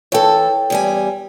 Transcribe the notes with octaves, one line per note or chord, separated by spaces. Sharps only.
E3 A4 C#5 G5
E2 G3 G#5